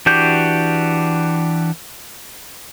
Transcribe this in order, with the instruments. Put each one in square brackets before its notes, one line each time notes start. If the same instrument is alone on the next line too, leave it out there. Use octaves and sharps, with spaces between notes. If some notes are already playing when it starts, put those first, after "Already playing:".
[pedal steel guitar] E3 D4 F#4 G4 G6